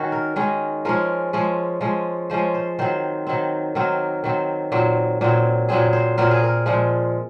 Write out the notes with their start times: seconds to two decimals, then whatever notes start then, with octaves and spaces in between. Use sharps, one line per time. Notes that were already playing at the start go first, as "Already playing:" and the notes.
Already playing: D#3 C#4 F#4
0.12 A#4
0.36 D#3 G#3 C#4
0.85 F3 G#3 C#4 A#4
1.33 F3 G#3 C#4
1.81 F3 G#3 C#4
2.30 F3 G#3 C#4 C5
2.54 C5
2.79 D#3 F#3 C4 C5
3.27 D#3 F#3 C4
3.75 D#3 F#3 C4 A#4
4.24 D#3 F#3 C4
4.72 A#2 F#3 C4
5.21 A#2 F#3 C4
5.69 A#2 F#3 C4 G#4
5.93 C5
6.18 A#2 F#3 C4 A#4
6.31 G#4
6.44 A#4
6.66 A#2 F3 G#3